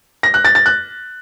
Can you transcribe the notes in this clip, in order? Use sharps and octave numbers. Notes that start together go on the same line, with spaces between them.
A#6
F#6
A6
A6
F#6